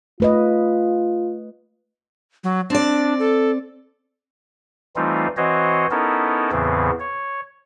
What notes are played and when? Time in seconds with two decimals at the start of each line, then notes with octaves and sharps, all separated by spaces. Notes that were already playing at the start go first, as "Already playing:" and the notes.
0.20 A3 F4 B4 D#5
2.44 F#3
2.70 C4 D4 D5
3.19 A4
4.96 E3 G3 A3 C4 D#4 F4
5.37 E3 C4 F#4 C5 C#5 D#5
5.91 B3 C#4 D#4 E4 A4 A#4
6.52 E2 A2 C#3 E3 B3 C4
7.00 C#5